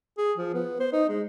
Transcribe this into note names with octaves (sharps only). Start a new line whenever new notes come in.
G#4
F3
B3
C5
D#4
G#3